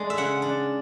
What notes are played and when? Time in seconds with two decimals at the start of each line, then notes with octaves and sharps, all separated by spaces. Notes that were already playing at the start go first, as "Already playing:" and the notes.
Already playing: G#3 A3 D4 G#5
0.10 E5
0.17 C#3 F#5
0.42 D4